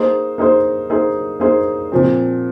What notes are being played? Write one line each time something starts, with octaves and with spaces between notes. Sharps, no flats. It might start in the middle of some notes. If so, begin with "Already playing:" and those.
Already playing: A#3 D#4 G#4 C5
A#3 D#4 G#4 C5
A#3 D#4 G#4 C5
A#3 D#4 G#4 C5
A#2 F3 C4